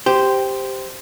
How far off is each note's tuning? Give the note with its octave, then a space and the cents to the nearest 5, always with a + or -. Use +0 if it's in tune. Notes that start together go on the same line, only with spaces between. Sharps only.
G4 +0 C5 -10